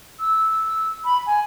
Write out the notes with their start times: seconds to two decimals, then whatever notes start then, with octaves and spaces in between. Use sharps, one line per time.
0.20 E6
1.05 B5
1.27 G#5